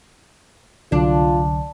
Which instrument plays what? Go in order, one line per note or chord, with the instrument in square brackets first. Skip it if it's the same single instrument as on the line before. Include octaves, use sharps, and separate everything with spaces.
[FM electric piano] C2 D3 F#3 [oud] D4 [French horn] F4